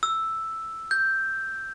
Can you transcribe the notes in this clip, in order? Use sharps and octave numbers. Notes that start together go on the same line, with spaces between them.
E6
G6